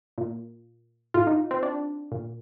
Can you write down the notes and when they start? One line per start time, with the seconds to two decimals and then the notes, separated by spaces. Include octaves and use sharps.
0.18 A#2
1.14 A2 F4
1.27 D#4
1.51 C4
1.63 D4
2.12 A#2